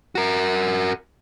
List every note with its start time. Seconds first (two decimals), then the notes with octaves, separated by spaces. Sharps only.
0.15 F#4 A#4